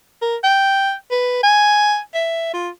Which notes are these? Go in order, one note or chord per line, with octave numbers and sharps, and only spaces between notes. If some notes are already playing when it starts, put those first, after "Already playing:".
A#4
G5
B4
G#5
E5
F4